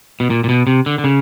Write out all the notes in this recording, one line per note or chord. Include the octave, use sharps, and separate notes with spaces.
B2
A#2
A#2
B2
C3
D3
D3
C#3